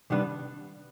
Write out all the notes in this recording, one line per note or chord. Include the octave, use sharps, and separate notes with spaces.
C3 D#3 G3 B3 D4